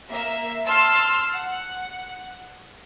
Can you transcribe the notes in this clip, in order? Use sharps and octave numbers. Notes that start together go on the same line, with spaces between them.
A#3 E5
A5 C6 E6 F6
F#5